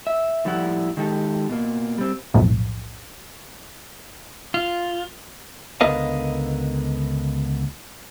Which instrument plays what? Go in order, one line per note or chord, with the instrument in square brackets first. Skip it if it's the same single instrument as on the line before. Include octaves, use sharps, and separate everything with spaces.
[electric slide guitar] E5
A2 F3 G3 E4 F#5
D#3 G#3 G4 A4
B2 A#3
G3 C4
[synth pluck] B1 F2 A2
[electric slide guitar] F4
[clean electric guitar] C#2 D3 B3 A#4 D#5 F5